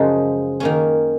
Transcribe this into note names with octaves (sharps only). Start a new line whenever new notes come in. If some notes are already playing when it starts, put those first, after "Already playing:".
Already playing: F#2 C#3 F3 G#3 D#4
D#3 A#3 C#4